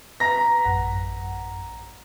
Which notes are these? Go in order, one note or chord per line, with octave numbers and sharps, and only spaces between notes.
B4 A#5 A#6 B6
A1 F#2 F#5